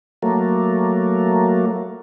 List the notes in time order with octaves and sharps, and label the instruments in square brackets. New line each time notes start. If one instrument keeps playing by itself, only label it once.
[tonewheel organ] F#3 A3 A#3